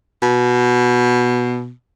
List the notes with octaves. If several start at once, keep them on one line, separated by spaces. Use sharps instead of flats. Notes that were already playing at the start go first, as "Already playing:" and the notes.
B2